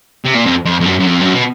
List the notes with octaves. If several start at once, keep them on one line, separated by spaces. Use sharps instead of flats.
C3
A#2
F2
F2
F2
F#2
F#2
F2
F#2
B2